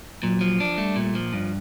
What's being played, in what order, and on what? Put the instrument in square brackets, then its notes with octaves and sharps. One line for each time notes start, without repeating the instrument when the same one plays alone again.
[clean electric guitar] A#2 [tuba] F#3
[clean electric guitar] F3
D4
[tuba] G3 [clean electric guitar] A3
[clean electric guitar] A#2
F3
G2